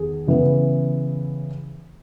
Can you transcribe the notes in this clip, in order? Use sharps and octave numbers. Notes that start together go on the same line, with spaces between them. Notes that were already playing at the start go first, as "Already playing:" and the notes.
Already playing: E2 D#3 G#4
C#3 E3 B3